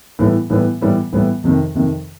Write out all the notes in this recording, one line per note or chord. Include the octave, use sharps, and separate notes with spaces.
A2 E3 G3 B3 E4
A2 E3 G3 B3 E4
A2 E3 G3 B3 E4
A2 E3 G3 B3 E4
F2 C3 D#3
F2 C3 D#3